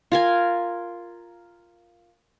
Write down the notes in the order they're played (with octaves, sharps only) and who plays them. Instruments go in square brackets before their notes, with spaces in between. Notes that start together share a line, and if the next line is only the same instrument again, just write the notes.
[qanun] F4 A#4 G#5